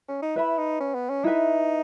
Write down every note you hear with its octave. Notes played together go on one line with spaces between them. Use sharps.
C#4
D#4
E4 B4 E5 B5
D#4
C#4
B3
C#4
D#4 E4 B4 E5